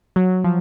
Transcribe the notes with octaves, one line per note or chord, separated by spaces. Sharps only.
F#3
F3